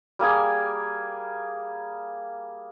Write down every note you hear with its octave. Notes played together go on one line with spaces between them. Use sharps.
G3 A#3 G#4 G#5